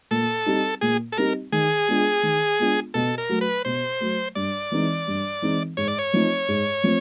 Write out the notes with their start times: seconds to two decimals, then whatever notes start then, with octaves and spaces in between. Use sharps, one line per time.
0.11 A#2 A4
0.46 G3 C4 D#4 G4
0.81 A#2 G#4
1.12 A4
1.17 G3 C4 D#4 G4 A#4
1.52 D#3 G#4
1.88 G#3 B3 D4 F4
2.23 D#3
2.59 G#3 B3 D4 F4
2.94 B2 A4
3.18 A#4
3.29 F#3 A3
3.41 B4
3.65 B2 C5
4.00 F#3 A3
4.35 G2 D5
4.71 E3 G#3 C4 D#4
5.07 G2
5.42 E3 G#3 C4 D#4
5.77 G#2 C#5
5.88 D5
5.99 C#5
6.13 F3 A3 C4 D#4
6.48 G#2
6.84 F3 A3 C4